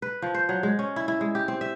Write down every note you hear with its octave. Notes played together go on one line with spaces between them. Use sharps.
B4
F3
C5
F#3
G#3
C#4
E4
E4
G#3
G4
C4
E5